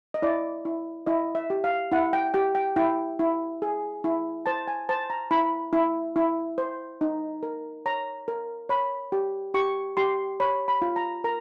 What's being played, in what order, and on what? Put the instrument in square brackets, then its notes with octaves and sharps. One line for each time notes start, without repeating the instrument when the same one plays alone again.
[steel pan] D#5
E4 D5
E4
E4 D#5
E5
G4
F5
E4 F#5
G5
G4 G5
G5
E4 G5
E4
G#4
E4
C5 A5
G#5
C5 A5
A#5
E4 B5
E4
E4
C5
D#4
A#4
C#5 A#5
A#4
C#5 B5
G4
G4 C#6
G4 C6
C#5 B5
B5
F4
A#5
A#4 A#5